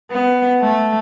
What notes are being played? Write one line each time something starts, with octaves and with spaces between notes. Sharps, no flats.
B3
A3